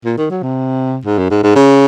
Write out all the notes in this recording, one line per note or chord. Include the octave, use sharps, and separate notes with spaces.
A#2
D#3
F#3
C3
G#2
F#2
G#2
G#2
C#3